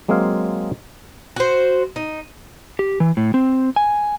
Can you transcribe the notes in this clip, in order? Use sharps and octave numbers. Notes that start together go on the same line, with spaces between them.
F#3 G#3 A#3 C4 G#4 F5
F#4 C5
D#4
G4
E3
A2
C4
G#5